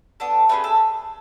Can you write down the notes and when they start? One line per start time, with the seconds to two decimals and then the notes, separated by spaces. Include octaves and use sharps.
0.20 B3 D4 A4
0.49 A3 C#4 G#4 B4
0.64 A4